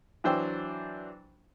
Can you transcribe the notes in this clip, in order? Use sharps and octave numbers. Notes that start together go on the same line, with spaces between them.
E3 F#3 D4 C5 G5 E6